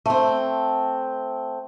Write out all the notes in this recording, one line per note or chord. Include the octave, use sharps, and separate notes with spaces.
A3 C4